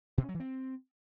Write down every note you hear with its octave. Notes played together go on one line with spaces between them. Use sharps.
B2
C#4
F#3
E3
C4